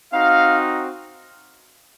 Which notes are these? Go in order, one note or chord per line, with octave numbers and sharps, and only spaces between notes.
C4 D#4 F#4 F5